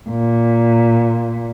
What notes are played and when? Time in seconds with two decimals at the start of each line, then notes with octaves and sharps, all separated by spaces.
0.10 A#2